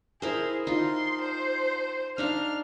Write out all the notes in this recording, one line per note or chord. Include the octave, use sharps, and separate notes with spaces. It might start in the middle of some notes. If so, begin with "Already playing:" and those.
E4 G#4 A#4 C5
D#4 F4 C6
C5
D4 D#4 F5 F6